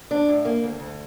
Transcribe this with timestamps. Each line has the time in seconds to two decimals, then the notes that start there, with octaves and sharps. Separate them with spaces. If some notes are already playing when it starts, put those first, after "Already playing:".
0.11 D4
0.28 A2
0.45 A#3
0.63 D2
0.80 D2